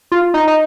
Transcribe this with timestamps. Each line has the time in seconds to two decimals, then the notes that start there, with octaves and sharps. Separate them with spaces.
0.12 F4
0.34 D#4
0.48 D#4